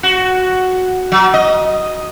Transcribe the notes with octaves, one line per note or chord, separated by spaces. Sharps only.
F#4
F#3
D#5